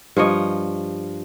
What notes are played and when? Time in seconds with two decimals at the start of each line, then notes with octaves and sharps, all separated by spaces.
0.17 G2 F3 C#5 D#5